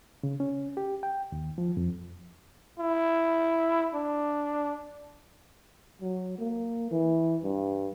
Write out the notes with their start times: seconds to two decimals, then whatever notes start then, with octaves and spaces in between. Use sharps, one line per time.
0.23 C#3
0.40 C#4
0.77 G4
1.03 G5
1.32 D#2
1.58 F3
1.77 F2
2.80 E4
3.94 D4
6.02 F#3
6.38 A#3
6.91 E3
7.43 G2